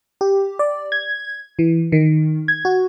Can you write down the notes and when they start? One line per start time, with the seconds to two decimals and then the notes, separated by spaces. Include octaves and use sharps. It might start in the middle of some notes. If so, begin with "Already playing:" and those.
0.21 G4
0.59 D5
0.92 G#6
1.59 E3
1.92 D#3
2.48 G#6
2.65 F#4